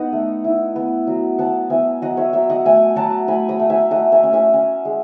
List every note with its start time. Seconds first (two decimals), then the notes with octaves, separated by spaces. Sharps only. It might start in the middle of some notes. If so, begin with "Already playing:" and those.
Already playing: B3 D#4 D#5 F#5
0.13 A3
0.44 E4
0.76 B3
1.07 F#3
1.39 B3 F#5 A5
1.70 B3 E5 G#5
2.02 F#3 D#5 F#5
2.17 C#5 E5
2.33 F#3 C#5 E5
2.50 D#5 F#5
2.65 A3 E5 G#5
2.96 F#3 F#5 A5
3.28 A3 G#5 B5
3.49 B5 D#6
3.60 A3
3.70 E5 G#5
3.91 A3 D#5 F#5
4.12 E5 G#5
4.23 C#4
4.33 E5 G#5
4.54 C#4
4.85 G#3